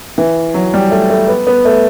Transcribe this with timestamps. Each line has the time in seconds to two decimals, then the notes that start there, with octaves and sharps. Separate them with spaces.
0.18 E3
0.54 F#3
0.74 G3
0.91 A3
1.10 A3
1.28 B3
1.47 B3
1.65 A3